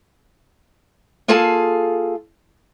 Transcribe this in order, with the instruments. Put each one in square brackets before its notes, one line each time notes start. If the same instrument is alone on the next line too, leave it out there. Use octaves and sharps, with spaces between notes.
[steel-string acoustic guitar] A#3 F4 G#4 A4 F5 A5